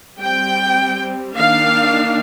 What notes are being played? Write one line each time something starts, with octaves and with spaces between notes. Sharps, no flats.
G3 C4 G5
D#3 A#3 D4 F5